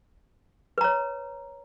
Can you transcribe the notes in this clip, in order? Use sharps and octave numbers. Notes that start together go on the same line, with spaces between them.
B4 C#5 A#5